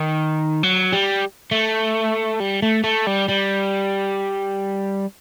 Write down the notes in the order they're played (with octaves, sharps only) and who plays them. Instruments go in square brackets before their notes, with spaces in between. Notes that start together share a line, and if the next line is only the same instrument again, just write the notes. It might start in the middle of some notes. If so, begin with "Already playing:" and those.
Already playing: [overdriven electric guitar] D#3
F#3
G3
A3
G3
A3
A3
G3
G3